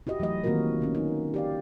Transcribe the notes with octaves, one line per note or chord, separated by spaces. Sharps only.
E4 F#4 G4 D#5
E3 F#3 A3 D#5
D#3 A#3 C4 F4 F#4 A#4
D3 B3 C#4
D#4
G4 D5 F5